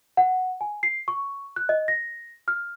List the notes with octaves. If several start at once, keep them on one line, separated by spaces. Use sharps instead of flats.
F#5
G#5
C7
C#6
F#6
D#5
A#6
F6